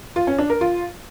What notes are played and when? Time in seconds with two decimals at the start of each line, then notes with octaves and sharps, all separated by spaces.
0.16 F4
0.27 C#4
0.38 D4
0.50 A#4
0.61 F4